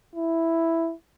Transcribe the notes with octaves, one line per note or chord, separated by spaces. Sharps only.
E4